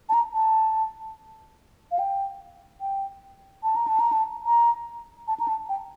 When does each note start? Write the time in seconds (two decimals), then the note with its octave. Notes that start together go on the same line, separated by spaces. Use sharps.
0.09 A5
0.14 A#5
0.34 A5
1.91 F5
1.99 G5
2.81 G5
3.63 A5
3.76 A#5
3.88 A5
4.00 A#5
4.12 A5
4.46 A#5
5.28 A5
5.40 A#5
5.48 A5
5.69 G5